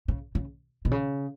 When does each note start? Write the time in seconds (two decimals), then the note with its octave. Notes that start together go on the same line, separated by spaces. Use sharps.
0.08 C#3
0.35 C#3
0.85 B2
0.91 C#3